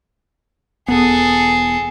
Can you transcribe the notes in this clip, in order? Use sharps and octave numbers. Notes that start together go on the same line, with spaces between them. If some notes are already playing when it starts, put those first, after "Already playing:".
E1 B3 G#4 A4